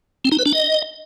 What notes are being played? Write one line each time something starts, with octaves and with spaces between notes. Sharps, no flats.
C4
D#4
B4
D4
D#5